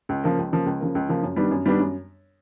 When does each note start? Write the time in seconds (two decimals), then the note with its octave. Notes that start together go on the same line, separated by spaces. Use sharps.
0.09 C#2
0.24 C#3 F3 A#3
0.38 C#2
0.53 C#3 F3 A#3
0.66 C#2
0.81 C#3 F3 A#3
0.95 C#2
1.09 C#3 F3 A#3
1.23 F#2
1.36 D#3 G3 B3 D4
1.51 F#2
1.66 D#3 G3 B3 D4
1.80 F#2